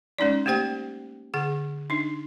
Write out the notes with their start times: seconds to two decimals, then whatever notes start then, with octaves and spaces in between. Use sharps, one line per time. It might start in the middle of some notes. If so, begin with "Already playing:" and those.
0.18 G#3 C#4 D#4 D5
0.46 A3 A#3 G4 C5 G5
1.34 D3 G#4 F#5
1.90 D4 D#4